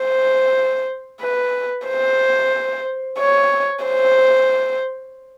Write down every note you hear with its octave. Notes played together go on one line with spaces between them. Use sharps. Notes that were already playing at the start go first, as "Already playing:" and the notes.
Already playing: C5
B4
C5
C#5
C5